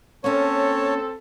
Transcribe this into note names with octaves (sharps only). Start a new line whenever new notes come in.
A#3 C4 C#4 A4 C#5